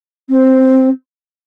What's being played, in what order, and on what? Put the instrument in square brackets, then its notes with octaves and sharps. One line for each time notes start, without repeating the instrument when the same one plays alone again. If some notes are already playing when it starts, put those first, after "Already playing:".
[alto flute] C4